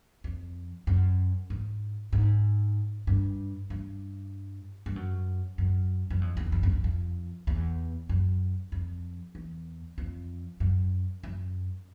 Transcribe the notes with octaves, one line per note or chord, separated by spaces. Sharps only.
F2
F#2
G#2
G#2
G2
G2
G2
F#2
F#2
F#2
F2
E2
F2
F#2
F2
F2
E2
F#2
F2
E2
F2
F#2
F#2